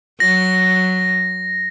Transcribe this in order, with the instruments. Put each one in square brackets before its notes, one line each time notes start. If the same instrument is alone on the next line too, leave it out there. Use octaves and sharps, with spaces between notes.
[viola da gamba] F#3 [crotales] A#6